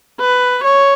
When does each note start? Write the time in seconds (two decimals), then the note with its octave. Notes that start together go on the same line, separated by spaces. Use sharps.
0.20 B4
0.64 C#5